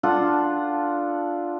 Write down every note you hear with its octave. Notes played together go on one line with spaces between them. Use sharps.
D4 F4 A4 F#5